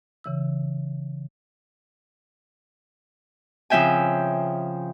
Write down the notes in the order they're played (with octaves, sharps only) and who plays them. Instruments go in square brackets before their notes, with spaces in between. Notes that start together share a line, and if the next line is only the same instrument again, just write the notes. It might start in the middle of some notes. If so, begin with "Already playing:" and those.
[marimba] C#3 E3 E6
[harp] C#3 F3 C4 E5 G5 G#5